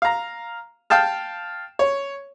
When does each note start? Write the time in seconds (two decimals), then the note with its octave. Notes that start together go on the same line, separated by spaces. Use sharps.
0.02 F5 A#5
0.90 F5 G5 A5 F6
1.79 C#5